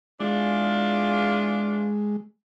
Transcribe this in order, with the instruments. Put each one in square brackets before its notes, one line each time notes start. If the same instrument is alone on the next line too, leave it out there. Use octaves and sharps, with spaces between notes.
[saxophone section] E2 D4 F4 [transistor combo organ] G#3